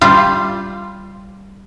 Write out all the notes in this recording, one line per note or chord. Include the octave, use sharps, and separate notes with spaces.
G3 F4